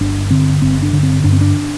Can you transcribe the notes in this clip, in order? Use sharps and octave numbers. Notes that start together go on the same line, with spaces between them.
G1 D4
D3 C4
G1 C4
D4
D3
C4
G2 D4
C4
D4